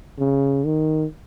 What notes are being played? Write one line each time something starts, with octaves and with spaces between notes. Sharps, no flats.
C#3
D#3